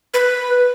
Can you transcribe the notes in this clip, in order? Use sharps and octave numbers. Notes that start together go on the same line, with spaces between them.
B4